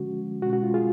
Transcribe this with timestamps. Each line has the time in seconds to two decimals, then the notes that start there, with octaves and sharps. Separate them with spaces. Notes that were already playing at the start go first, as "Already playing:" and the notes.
Already playing: D3 F3 G#3 C#4 F#4
0.42 B2 G#3 C#4 F#4
0.53 F#4
0.63 F4
0.74 F4 G#4